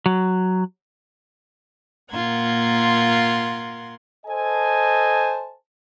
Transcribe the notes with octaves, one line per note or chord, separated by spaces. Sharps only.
F#3
A#2 F4 A#4 F#5 C6 G#6
A4 C5 D#5 G#5 A5